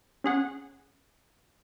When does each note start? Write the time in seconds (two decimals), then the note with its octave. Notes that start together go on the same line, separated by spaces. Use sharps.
0.24 C#4 G#4 F#5